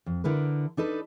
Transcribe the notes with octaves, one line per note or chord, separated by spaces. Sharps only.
F2
D3 E4 A#4 B4
D4 D#4 A4 B4